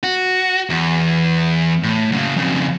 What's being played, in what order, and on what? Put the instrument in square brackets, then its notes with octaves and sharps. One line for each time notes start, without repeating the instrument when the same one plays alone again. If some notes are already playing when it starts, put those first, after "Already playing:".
[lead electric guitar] F#4
E2
A2
F#2 C#3
F2 C#3